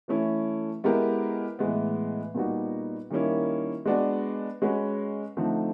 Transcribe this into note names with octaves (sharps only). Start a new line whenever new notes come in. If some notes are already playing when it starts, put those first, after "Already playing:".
E3 A3 C#4 E4
G#3 B3 E4 G4 A#4
A2 E3 G#3 B3
A#2 G3 B3 D#4 F#4
D#3 G3 A#3 C#4 E4
G#3 B3 D4 F#4
G#3 C#4 F#4 B4
D3 F3 A3 C4 D#4